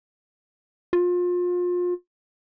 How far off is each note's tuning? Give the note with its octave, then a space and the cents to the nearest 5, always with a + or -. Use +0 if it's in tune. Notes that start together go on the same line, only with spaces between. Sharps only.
F4 +30